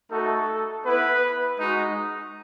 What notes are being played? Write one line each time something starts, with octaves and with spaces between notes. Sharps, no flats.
A3 D#4 F#4 A4
B3 E4 B4
G#3 D#4 F#4